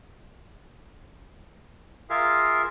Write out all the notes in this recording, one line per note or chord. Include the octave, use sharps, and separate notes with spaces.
F4 G#4 A#4 E5 F5